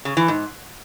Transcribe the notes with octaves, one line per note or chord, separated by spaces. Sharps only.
C#3
E3
G#2